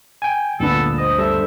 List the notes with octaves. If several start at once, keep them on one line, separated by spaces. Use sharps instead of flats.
G5 G#5
G1 D2 A#2 B3 D4 A4
C5 D#5
G3 A4 E5